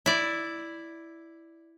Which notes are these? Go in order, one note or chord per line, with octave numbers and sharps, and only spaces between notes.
E4 D5